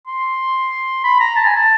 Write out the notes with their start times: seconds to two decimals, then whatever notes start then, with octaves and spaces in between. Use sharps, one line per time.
0.07 C6
1.04 B5
1.20 A#5
1.36 A5
1.46 G#5
1.56 A5